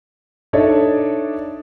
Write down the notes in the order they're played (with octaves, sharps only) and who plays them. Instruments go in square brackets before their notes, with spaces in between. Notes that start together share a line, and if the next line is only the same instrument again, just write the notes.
[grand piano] D4 D#4 A4 C#5 D5 E5